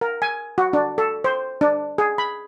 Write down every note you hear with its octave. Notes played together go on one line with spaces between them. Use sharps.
A#4
G#5
F#4
D4
A4
C5
D4
G#4
B5